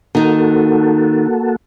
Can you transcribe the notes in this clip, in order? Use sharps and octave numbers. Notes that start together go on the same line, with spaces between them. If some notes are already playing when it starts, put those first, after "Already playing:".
D#3 A#3 D#4 F#4 A4